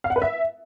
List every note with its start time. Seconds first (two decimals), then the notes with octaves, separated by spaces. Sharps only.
0.04 F5
0.10 F#5
0.16 B4
0.22 E5